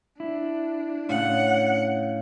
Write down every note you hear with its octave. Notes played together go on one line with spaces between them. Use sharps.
D4 E4
A2 C#3 G#4 F#5